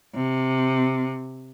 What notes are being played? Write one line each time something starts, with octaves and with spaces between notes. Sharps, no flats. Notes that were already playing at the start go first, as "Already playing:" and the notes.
C3